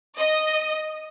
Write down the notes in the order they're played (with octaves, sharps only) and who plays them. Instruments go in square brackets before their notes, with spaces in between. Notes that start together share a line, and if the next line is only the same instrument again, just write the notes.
[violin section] D#5